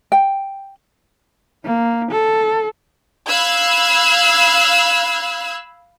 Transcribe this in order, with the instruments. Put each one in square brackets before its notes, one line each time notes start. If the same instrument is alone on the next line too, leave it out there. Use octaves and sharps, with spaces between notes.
[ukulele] G5
[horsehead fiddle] A#3
A4
[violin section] F5 B5 E6 F#6 G#6